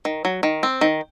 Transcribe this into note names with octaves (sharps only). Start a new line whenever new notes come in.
D#3
F#3
D#3
C4
D#3